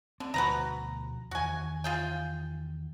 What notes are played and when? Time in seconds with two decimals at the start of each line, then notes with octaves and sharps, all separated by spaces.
0.20 D3 C4
0.34 D2 B2 F3 F#4 B4 A#5
1.31 E2 D#3 F#4 G#5
1.84 F4 G#4 G5